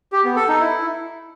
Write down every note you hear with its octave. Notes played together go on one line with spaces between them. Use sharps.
G4
B3
A4
D#4
E4